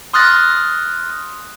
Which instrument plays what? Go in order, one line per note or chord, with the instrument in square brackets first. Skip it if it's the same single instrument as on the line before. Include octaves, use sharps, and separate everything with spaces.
[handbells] C6 D#6 F6 F#6 A6 A#6